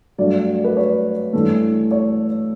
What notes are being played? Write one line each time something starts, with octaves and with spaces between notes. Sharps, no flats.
G2 F#3 A3 D5
B4
C#5
G2 E3 A3
C#5